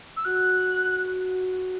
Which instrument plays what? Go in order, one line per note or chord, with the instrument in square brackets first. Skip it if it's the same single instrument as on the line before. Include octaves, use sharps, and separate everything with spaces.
[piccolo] E6
[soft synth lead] F#4 [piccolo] F#6